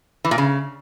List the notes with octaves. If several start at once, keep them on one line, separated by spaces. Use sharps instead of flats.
E3
A#2
C#3